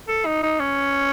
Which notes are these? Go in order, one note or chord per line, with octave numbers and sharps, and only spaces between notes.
A4
D#4
D#4
C#4